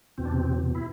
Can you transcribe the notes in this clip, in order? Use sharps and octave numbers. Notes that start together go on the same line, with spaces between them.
E2 B2 C4
D4
C3 C4
E4